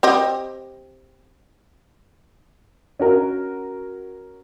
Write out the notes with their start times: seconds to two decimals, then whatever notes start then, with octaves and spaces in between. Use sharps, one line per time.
0.03 C4 G4 D#5
2.99 C#4 F#4 A#4